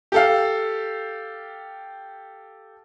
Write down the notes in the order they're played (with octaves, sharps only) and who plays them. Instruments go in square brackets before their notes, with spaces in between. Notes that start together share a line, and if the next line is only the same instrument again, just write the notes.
[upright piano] G4 A4 F5